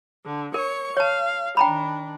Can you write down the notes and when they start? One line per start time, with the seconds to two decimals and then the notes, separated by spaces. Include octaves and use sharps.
0.24 D3
0.54 A#4 C#5 C#6
0.97 C#5 F5 A5
1.57 D#3 D4 G5 A#5 B5